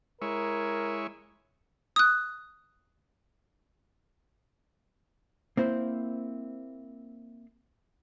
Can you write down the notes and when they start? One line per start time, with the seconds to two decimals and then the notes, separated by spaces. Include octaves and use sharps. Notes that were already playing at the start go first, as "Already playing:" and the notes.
0.22 G#3 E4 A#4 C#5
1.96 D#6 F#6
5.57 A#3 C4 E4 C5